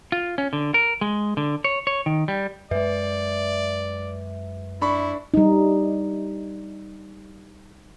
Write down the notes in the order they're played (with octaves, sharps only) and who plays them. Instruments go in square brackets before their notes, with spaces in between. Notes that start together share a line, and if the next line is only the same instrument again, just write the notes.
[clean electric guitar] F4
C#4
D3
A#4
G#3
D3
C#5
C#5
D#3
G3
[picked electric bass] F#2 G#3 [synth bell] B4 E5 [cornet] D5
[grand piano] D4 B5 C#6 [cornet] E4
[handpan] G3 D#4